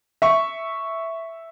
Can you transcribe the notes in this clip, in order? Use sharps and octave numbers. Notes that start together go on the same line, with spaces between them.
E5 C#6